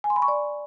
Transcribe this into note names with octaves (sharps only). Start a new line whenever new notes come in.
G#5
C6
B5
C#6
D5